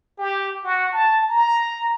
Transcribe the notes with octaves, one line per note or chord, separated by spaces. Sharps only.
G4
F#4
A5
A#5